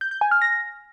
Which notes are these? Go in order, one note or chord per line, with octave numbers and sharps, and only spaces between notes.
G6
G6
G#5
F6
A#6